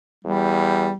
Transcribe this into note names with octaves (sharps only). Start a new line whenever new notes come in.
E2 G3